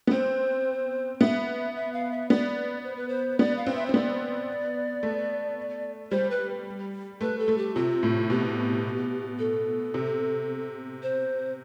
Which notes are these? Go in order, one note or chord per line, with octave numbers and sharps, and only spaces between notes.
B3
C4 C5
B3 E5
E5
F5
E5
B3 D5
C5
B4
C5
B3 D5
F5
C4
E5
C5
C4
B3 D5
A3
G3 C5
B4
A3 B4
A4
A3
G4
C3 F4
A2
B2 G4
A4
C3
C5